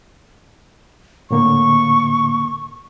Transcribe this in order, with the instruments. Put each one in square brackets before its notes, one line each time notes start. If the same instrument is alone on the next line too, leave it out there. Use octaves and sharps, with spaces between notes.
[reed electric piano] A2 D3 A#3 [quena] C#6